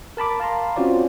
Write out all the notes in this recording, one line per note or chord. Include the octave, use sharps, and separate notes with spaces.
A#4 A5 B5 D6
F5 A5 A#5 C6
C4 C#4 F4 F#4 C5 D5